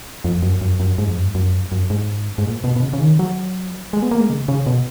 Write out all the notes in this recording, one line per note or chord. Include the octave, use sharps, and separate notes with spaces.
F2
F#2
F#2
F#2
G#2
F2
F#2
G#2
F#2
F#2
G#2
G#2
A#2
B2
B2
C#3
C#3
D#3
F#3
G#3
B3
A#3
G#3
C#3
C#3
B2